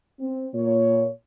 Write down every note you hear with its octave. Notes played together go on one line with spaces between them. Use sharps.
C4
A#2 C#5